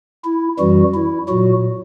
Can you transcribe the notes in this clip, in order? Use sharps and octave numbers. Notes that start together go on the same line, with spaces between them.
E4
F#2 E3 G3 F#4
E4
A#2 F#3 F#4